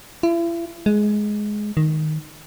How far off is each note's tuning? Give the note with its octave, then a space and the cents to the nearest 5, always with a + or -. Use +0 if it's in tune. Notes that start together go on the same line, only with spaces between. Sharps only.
E4 +40
G#3 +10
D#3 -5